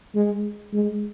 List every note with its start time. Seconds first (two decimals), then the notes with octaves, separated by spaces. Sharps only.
0.15 G#3
0.73 G#3